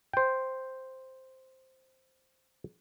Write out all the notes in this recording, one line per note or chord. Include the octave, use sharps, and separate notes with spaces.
C5 G5